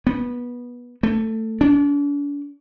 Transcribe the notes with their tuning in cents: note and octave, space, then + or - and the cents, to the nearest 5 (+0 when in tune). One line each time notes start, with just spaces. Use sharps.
B3 -20
A3 +15
D4 -40